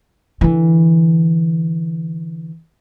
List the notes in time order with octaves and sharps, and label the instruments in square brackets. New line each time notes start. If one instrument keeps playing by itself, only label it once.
[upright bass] D3 E3